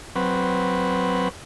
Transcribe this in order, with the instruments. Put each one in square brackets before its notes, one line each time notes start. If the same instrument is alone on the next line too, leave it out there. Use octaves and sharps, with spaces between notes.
[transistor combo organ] F#3 C4 B4